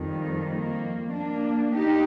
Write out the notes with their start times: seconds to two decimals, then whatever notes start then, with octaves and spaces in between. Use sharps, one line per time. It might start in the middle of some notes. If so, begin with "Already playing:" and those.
Already playing: F2 D#3 G3
0.50 A#3
1.14 A#3 D4
1.75 D#4 G4